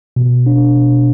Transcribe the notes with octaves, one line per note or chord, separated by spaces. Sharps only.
B2
D4
B2